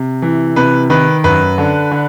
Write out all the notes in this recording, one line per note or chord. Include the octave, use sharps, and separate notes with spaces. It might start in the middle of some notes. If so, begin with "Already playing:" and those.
Already playing: C3
E3
C3 B4
D#3 B4
F#2 B4
D3
D3